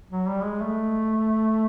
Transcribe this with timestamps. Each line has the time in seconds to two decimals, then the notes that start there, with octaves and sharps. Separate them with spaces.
0.10 F#3
0.27 G3
0.44 G#3
0.61 A3